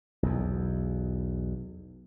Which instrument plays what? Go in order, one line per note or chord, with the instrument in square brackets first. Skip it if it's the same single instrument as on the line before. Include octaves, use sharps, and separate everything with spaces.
[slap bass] B1 E2